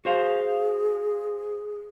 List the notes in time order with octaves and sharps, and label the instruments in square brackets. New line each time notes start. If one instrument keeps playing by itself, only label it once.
[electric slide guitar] F#4 C5 F5 [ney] G#4